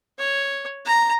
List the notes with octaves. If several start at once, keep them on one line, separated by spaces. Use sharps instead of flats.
C#5
A#5